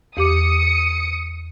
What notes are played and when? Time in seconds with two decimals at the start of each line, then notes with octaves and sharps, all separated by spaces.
0.17 E2 G4 D6 D#6 C#7